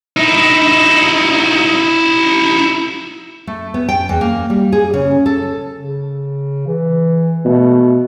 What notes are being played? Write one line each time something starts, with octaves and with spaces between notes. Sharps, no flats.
D#4 E4
A3
B3
G5
E2
A#3
G3
G#4
C#3
A4
C#3
E3
B2 A3